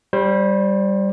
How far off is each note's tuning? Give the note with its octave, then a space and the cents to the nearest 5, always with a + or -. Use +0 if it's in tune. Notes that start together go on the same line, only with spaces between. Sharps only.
G3 +0 C5 +30